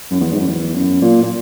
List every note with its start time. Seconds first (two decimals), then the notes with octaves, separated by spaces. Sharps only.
0.11 F#2
0.21 E2
0.32 G#2
0.40 F#2
0.48 E2
0.75 F#2
1.02 A#2
1.22 A#2